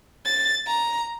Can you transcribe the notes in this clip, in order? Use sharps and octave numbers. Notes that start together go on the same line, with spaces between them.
A6
A#5